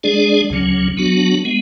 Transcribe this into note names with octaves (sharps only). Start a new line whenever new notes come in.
G#3 D4 G#4 D5
D2 C#3 F#3 C#4
F#3 B3 D4 F#4
G#3 B3